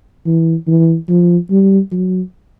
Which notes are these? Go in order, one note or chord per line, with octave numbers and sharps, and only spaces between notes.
E3
E3
F3
G3
F#3